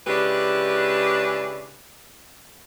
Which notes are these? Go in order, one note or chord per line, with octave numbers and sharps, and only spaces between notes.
C#3 G#3 D4 E4 G4 B4